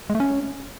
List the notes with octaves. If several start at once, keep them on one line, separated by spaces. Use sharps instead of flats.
G#3
A3
C#4